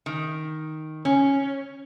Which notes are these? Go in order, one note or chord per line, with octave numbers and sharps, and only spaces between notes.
D#3
C#4